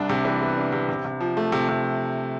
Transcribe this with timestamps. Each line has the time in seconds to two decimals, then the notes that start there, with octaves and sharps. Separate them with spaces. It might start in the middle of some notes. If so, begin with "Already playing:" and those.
Already playing: C2 D4
0.09 C3
0.25 E3
0.41 B3
0.57 D4
0.72 C3
0.89 C3
1.05 C3
1.20 F3
1.37 A3
1.52 C3
1.68 C3